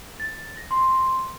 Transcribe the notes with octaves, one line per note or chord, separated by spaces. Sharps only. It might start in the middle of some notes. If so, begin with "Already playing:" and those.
A6
A#6
C6